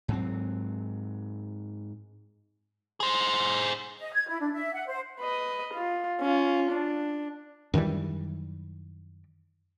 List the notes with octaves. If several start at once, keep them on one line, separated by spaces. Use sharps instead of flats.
G#2 F#3 C4
G#4 C5
D#5
G#6
E4
D4
E5
F#5
C5
B4 D#5
F4
C#4 F4
D4
F#2 D#3 E3 G3